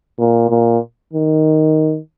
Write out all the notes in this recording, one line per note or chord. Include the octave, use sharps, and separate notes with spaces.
A#2
A#2
D#3